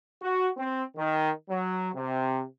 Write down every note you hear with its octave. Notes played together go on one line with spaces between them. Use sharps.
F#4
C4
D#3
F#3
C3